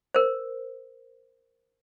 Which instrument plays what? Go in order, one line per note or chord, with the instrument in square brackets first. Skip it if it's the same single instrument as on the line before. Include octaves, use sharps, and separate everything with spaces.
[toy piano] A#4 C5